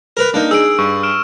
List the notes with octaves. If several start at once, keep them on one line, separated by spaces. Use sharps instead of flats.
A#4 B4
A#3 D4 D#4
G#4 E6 D7
G2 C#6
F6 D7 E7